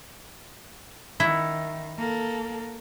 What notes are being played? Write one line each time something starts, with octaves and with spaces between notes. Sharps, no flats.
D#3 E4 E5 F#5
A#3 A4